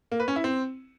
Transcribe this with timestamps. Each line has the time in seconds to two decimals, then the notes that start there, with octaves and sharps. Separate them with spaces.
0.12 A#3
0.20 B4
0.28 C#4
0.36 E4
0.44 C4